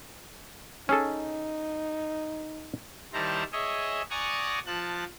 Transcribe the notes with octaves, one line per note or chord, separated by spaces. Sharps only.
C#4 D#4 G#4 A4
D#3 G3 E4 C5 A5 A#5
G#4 C#5 D#5 E5
D5 F#5 G#5 A#5 C#6 D#6
F3 A5 F#6